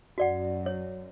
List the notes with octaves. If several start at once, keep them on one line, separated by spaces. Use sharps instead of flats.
F#2 F#4 D5 F#5
C#5